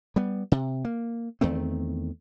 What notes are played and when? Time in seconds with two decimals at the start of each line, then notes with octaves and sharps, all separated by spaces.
0.16 G3 B3
0.52 C3
0.85 A#3
1.41 E2 D#3 A3 C4